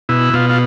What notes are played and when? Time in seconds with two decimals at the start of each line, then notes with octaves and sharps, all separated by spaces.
0.09 B2 E4
0.34 B2 F4
0.50 F4